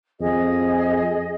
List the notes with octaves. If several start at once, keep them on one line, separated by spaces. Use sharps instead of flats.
F2 G#4 D#5